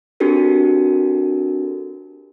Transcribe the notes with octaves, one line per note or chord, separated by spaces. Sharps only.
C4 D4 F#4 G4 A4 A#4